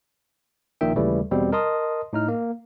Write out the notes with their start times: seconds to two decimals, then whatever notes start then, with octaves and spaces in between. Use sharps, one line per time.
0.81 A#1 A#2 D#3 E5 G5
0.96 D#2 C#3 E3 G3 A3
1.31 E2 B2 G3 C4
1.52 A#4 D#5 A5 C6 D#6
2.13 A2 D#4 F6
2.28 A#3